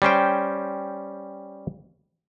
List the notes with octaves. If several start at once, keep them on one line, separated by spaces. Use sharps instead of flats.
G3 C#4 C5 G5